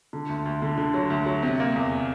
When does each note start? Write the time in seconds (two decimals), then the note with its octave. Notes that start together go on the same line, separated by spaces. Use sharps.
0.13 D3
0.29 D2
0.46 D2
0.62 D3
0.78 D3
0.94 F#3
1.10 D2
1.26 F#3
1.43 C3
1.60 A#3
1.76 E2